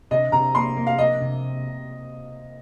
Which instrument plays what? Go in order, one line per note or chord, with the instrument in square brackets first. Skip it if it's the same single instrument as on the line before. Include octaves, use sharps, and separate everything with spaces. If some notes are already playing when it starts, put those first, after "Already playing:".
[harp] C3 [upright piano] D#5
[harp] C3 [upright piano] A#5
[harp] A#3 [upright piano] C6
[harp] A#3
[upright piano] F5
[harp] A#3 [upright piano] D#5
[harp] C3